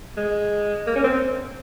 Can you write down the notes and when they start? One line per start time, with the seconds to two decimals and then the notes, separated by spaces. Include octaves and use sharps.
0.17 G#3
0.87 A#3
0.96 C#4
1.04 C4